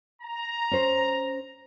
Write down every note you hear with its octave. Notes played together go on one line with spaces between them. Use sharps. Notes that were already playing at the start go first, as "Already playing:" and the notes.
A#5
C#4 C5